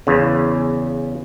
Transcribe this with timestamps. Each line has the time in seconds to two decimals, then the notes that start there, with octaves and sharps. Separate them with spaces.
0.07 E2 C#3